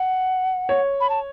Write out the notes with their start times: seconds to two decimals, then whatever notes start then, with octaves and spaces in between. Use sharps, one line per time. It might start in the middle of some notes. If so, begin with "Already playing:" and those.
Already playing: F#5
0.69 C#5
1.01 B5
1.10 A5